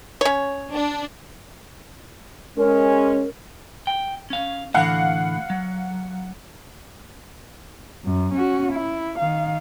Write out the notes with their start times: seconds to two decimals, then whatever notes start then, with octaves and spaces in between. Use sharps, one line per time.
0.21 C#4 C#5
0.73 D4
2.57 G#3 C#4 A#4
3.87 G5
4.30 C#4 F5
4.74 A2 D3 E3 F5 F#5
5.50 F#3
8.05 F#2
8.34 C#4 F#4
8.72 E4
9.18 D#3 F5